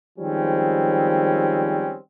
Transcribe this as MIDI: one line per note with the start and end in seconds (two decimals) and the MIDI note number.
0.19 1.97 51
0.19 1.97 53
0.19 1.97 55
0.19 1.97 56
0.19 1.97 60
0.19 1.97 61